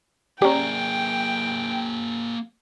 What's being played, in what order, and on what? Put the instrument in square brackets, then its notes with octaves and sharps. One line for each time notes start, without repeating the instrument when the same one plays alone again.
[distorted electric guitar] A#3 G#4 [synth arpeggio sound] C#4 G4 [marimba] D5 A#5 [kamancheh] G5